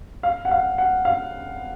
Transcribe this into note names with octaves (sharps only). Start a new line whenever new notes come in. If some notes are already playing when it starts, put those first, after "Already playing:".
F5
F#5
F5
F#5
F5